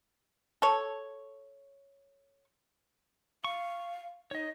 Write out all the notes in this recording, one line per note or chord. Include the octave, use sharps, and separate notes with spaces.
A4 C#5
F5 C#6
D#4 C#5 D#5